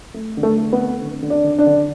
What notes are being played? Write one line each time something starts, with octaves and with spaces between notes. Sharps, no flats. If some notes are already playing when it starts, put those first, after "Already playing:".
A3
D3
A3 A4
A3
B3 B4
C4
D3
D3
D4 D5
D3
D4 D5
D3